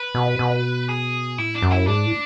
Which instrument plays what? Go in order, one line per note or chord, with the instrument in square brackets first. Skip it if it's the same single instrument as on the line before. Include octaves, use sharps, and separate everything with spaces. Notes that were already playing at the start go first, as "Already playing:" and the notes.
Already playing: [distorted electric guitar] B4
[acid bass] B2
B2
[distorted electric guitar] G#4
[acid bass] A2 [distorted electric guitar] E4
[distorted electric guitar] D4
[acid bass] F#2
[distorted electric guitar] E4
[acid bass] G#2 [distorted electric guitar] D4
[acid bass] A2